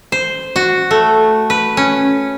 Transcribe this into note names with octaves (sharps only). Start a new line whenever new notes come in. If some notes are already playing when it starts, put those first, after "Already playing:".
C5
F#4
A3
B4
C#4